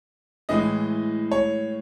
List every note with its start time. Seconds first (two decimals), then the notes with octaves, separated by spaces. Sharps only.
0.49 A2 E3 G#3 D#5
1.32 C#5